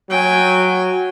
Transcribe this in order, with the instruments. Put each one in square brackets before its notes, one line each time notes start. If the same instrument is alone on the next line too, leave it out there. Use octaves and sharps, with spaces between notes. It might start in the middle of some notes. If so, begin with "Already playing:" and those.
[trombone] F#3 [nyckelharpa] G5 G#5